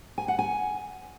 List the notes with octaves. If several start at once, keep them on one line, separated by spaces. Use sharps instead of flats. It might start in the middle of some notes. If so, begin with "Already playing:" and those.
G#5
F#5
G#5